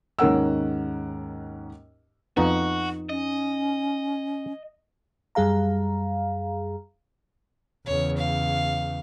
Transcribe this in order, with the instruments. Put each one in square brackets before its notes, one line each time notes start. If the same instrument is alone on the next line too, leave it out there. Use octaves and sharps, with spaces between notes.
[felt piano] D#2 G#2 C#4 A#4 F#5 E6
[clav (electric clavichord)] F2 B3 [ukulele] D#4 [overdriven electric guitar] F#4
[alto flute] C#4 [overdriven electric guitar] D#5
[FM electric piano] F#2 G3 G#4 F5 A#5
[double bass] E2 C#3 [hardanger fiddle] C#5
[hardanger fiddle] F5